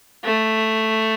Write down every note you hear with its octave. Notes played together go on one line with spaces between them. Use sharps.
A3